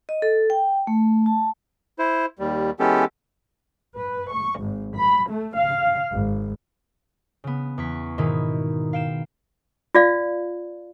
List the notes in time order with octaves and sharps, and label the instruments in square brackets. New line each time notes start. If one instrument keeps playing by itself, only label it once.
[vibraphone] D#5
A4
G5
A3
A5
[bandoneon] E4 C5
D#2 G3
E3 G#3 B3 C#4 G4 A4
[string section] B4
C#6
G#1
B5
A3
F5
G#1
[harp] C#3 B3
E2 C#6 B6
G#2 B2 D#3 D#4 E4
F5 G5 E7
[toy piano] F4 D5 F5